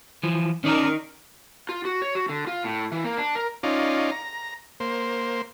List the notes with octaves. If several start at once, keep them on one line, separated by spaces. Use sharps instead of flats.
E3 F3
D#3 C#4 D#4 A#4 D5
F4
F#4
C#5
F#4
D3
F4
A2
E3
A#3
D4
A#4
C#4 D#4 F4 D5
A#5
A#3 C5